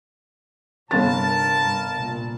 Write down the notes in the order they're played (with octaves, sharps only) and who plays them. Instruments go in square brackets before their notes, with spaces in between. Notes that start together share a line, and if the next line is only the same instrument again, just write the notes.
[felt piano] G1 A6 [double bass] G2 C3 [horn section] A#4 A5
[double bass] C2 A#2